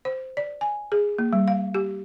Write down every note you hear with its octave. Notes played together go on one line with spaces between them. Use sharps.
C5
D5
G#5
G#4
A#3
G3
F5
G4